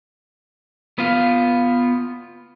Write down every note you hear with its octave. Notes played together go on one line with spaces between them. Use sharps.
B3 F4